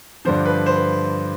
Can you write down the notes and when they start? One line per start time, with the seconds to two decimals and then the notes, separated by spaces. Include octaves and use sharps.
0.25 G2 D3 F3 C5
0.45 B4
0.66 C5
0.76 B4